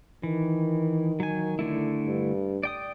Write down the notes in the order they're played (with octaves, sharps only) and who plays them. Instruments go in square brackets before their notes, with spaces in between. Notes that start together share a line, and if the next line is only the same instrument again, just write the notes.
[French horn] D#3 [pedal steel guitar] E3
[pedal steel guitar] F#3 G#5
D3 A3 E4
[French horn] G2
[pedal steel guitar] D5 G5 D#6